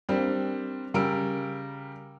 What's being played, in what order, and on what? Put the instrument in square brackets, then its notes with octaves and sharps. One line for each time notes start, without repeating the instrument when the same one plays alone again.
[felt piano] G3 A#3 C4 D4
C#3 G3 A#4 E6 D7